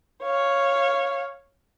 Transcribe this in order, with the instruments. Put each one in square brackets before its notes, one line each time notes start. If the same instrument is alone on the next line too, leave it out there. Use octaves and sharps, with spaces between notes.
[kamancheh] C#5 F5